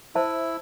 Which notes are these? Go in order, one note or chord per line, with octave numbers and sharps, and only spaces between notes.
E4 C5 E5 A5